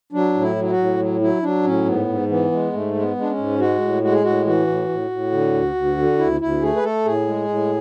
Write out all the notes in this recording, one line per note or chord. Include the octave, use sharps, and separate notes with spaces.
F#3 D4
A2
E4
F#3
E4
F#4
A2
F#3
F#3 E4
F#3 D4
A2 C#4
G#2 B3
G#2
E3 B3
G#3
G#2 A3
G#3
B3
G#3
D4
C#4
G#2
G#3 F#4
A2
G#3 F#4
G#4
A2 F#4
E3 F#4
A2
A2
A2
D3
D2
D2
D3
D2 E4
D2 E4
A3 G#4
B4
A3 A4
A2 G#4
G#3
A2